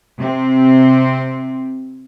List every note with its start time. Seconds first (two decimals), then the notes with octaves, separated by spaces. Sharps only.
0.20 C3 C4